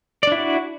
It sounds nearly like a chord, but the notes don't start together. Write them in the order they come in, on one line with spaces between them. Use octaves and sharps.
D5 D4 E4 F#4